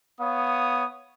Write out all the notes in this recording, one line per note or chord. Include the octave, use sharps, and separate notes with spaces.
B3 C#5 F5 D#6